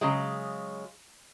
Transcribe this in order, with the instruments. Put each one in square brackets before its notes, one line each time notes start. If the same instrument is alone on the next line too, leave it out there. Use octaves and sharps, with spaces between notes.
[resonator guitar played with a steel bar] C#3 F#3 G#3